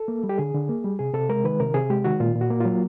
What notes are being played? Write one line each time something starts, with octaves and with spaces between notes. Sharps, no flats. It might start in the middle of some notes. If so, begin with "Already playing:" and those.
Already playing: A4
A#3
G3
G4
D3 G#4
D3
A#3
G3
C3 G#4
C3 A4
G#3 A#4
D#3 B4
C3 A#4
C3 G#4
G#3 G4
D#3 F#4
A#2 F4
A#2
F#4
A#3
F#3 F4